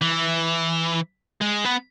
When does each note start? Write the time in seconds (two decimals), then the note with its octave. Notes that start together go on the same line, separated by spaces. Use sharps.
0.02 E3
1.42 G#3
1.65 B3